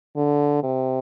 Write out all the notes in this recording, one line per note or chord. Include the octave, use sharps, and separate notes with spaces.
D3
C3